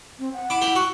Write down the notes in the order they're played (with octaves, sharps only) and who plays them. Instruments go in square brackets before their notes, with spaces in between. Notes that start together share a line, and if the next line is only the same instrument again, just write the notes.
[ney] C4
F#5
[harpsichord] E4 D6
E4 G4
F#4